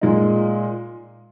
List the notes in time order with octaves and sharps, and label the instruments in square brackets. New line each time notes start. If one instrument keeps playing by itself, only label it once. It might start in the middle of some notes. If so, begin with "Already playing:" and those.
[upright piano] A#2 G#3 D#4